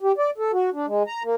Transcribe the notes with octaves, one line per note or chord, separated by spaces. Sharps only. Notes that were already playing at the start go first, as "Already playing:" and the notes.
G4
D5
A4
F#4
D4
G#3
A#5
A#3